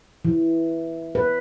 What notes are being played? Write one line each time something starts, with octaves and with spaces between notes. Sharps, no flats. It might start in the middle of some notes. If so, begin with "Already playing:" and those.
E3
B4